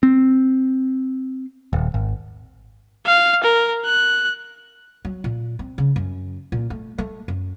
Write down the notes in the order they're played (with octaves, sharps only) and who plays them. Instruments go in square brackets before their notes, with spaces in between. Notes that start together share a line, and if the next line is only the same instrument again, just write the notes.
[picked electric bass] C4
D#1
G#1
[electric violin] F5
A#4
F#6
[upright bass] F#3
A#2
C4
C#3
F#2
A#2
A3
A3
F#2